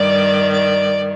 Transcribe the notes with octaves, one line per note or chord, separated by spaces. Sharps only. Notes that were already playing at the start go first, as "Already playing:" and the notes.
Already playing: G2 D#3 D5
D5